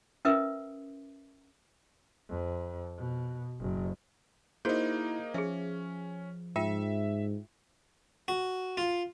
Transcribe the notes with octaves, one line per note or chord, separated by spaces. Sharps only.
C#4 E4 A#4 B4 E5 D#6
F2
B2
F#1
A#3 D#4 E4 F#4 G#4 C5 G6
F3 C#4 G#4 E5
G#2 F4 A#4 E5 G5
F#4
F4